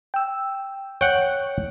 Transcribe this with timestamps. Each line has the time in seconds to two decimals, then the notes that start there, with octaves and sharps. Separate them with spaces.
0.14 G5 E6
1.01 C#5 F#5 G5